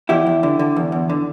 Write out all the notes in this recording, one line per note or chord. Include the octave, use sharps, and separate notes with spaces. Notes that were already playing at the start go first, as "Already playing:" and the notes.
E2 E4 G4
E2
D3
D3
E2
E2
D3